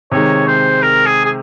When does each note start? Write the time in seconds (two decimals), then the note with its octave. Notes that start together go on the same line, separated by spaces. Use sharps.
0.12 C3 D#3 G#3 C#5
0.48 C5
0.82 A#4
1.06 G#4
1.25 G#4